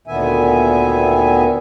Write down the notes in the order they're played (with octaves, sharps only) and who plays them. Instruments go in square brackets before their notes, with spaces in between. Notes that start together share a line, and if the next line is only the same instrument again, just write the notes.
[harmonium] D2 A#2 D#3 B3 E5 G#5